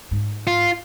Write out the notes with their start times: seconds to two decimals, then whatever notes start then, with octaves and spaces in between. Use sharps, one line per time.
0.11 G#2
0.47 F4